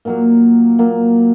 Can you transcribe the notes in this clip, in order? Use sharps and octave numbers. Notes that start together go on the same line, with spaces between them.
A#2 F#3 A#3
A#2 F#3 A#3